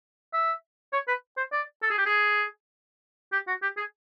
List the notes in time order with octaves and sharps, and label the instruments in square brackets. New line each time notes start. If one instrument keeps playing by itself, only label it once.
[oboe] E5
C#5
B4
C5
D5
A4
G#4
G4
G#4
G4
F#4
G4
G#4